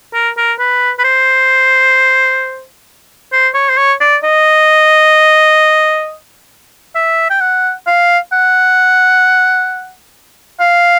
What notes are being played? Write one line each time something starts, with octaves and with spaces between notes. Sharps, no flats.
A#4
A#4
B4
B4
C5
C5
C#5
C5
C#5
D5
D#5
E5
G5
F#5
F5
F#5
F5